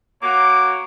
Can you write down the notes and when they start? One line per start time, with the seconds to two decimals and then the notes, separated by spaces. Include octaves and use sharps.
0.23 A#3 F#4 C#5 D6